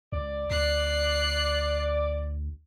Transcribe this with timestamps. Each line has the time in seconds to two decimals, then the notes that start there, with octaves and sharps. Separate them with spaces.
0.12 C#2 D5
0.51 D2 F#6 C7